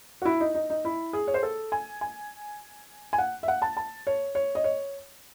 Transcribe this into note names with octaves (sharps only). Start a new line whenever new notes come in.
F#4
E4
D#4
D#4
D#4
E4
G#4
C#5
C5
A4
G#5
G#5
G#5
F#5
E5
F#5
A5
A5
C#5
C#5
D#5
C#5